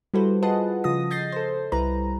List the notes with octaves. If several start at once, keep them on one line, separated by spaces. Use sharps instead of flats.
G3 E4 F#4 A4 B4 C5
F4 G#4 B4 D#5 F#5 A5
C#3 F3 F4 D#6 A#6
D#5 G6 A6 A#6 C7
A4 C5
C2 G3 E4 B4 A#5